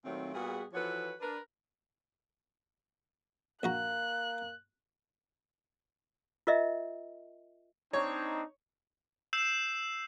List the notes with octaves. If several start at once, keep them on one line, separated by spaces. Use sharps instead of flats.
A#2 D#3 F#3 A3 C4
A#2 G3 B3 F#4 G#4
E3 F3 F#4 A4 B4 C#5
D4 A#4 B4
A#1 A#3 F#4 A#5 F#6
F4 A#4 D#5 E5
C4 D4 D#4 C#5
E6 G6 C7 E7